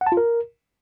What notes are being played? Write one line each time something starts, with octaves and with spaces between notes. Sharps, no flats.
F#5
A5
F4
A#4